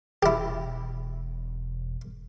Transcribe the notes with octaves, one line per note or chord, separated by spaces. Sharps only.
E1 E4 G4